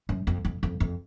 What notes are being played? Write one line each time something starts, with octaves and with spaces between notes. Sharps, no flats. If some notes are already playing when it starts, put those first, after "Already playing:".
F#2
F2
F2
F2
F2